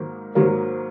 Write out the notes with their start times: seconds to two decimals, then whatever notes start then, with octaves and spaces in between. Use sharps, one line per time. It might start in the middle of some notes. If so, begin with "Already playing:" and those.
Already playing: G#2 D#3 F#3 A#3
0.35 G#2 D#3 F#3 A#3